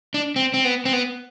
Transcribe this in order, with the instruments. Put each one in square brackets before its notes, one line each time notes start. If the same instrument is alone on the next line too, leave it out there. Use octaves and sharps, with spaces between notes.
[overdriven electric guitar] D4
C4
C4
B3
C4
B3